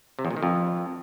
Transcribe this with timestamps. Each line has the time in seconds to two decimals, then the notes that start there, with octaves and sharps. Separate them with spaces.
0.19 C3
0.25 E2
0.31 A#2
0.37 D#3
0.43 F2